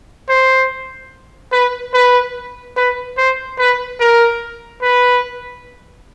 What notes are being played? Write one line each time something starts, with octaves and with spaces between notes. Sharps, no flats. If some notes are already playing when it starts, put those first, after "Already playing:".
C5
B4
B4
B4
C5
B4
A#4
B4